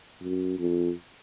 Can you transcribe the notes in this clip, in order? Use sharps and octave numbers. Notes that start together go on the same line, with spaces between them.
F#2
F2